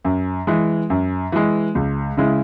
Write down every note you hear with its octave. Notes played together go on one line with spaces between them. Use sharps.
F#2
E3 G#3
F#2
E3 G#3
C#2
C#3 G#3 E4